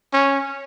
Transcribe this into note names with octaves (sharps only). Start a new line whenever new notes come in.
C#4